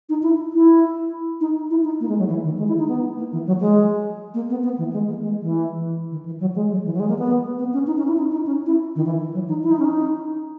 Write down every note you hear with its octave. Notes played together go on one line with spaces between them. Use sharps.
D#4
E4
E4
D#4
E4
D#4
A#3
G#3
F#3
E3
D#3
G#3
E4
D#4
B3
A#3
E3
F#3
G#3
A#3
B3
B3
E3
G#3
A#3
G#3
E3
D#3
E3
F#3
G#3
F#3
E3
F#3
G#3
A#3
B3
B3
C#4
D#4
C#4
E4
D#4
D#4
C#4
E4
D#3
E3
E3
F#3
D#4
E4
D#4
C#4
D#4